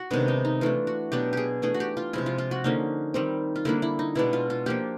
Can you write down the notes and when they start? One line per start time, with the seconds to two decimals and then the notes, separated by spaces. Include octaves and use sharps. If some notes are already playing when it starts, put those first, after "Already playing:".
Already playing: F#4
0.10 C3 D#3 G#3 B3 D4
0.28 D#4
0.45 D#4
0.61 E3 A3 D4 F4
0.87 F#4
1.12 B2 F#3 B3 D4 G4
1.33 G4 G#4
1.62 E3 A3 D4 G#4
1.74 F#4
1.80 G4
1.97 F4
2.13 C3 F3 G#3 E4
2.26 F4
2.38 F4
2.51 F#4
2.64 D3 F3 A#3 C#4 D#4
3.14 D#3 G3 C4
3.56 F4
3.65 D3 G3 A#3 D4 E4
3.82 E4
3.99 D#4
4.15 B2 G#3 B3 D4 E4
4.33 F4
4.50 F4
4.66 F3 A#3 D4 G4